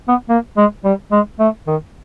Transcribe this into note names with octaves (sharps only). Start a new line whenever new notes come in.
B3
A#3
G#3
G3
G#3
A3
D#3